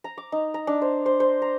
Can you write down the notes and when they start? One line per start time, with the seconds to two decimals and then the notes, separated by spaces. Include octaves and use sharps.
0.04 A#5
0.18 D6
0.32 D#4
0.54 A#5
0.67 D4
0.82 C5
1.06 C5
1.20 C5
1.42 A#5